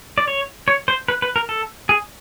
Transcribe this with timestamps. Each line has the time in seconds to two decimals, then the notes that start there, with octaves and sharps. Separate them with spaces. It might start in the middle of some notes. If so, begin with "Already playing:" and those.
0.18 D5
0.28 C#5
0.68 C#5
0.88 C5
1.08 B4
1.22 B4
1.36 A#4
1.49 A4
1.89 G#4